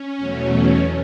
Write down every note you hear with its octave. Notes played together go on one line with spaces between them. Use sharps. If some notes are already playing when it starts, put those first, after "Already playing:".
Already playing: C#4
E2 B2 F#3 A3